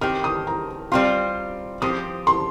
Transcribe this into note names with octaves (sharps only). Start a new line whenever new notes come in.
D#3 C4 G4 F6
D#6
A#5
G3 C4 F4 C6
F3 C4 G4 D#6
C6